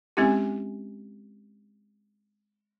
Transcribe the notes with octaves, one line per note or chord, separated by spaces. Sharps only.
G#3 C4 C#4 E4 G4